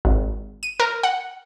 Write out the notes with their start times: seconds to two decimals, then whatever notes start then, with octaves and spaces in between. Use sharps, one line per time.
0.05 G#1
0.63 D#7
0.80 A#4
1.03 F#5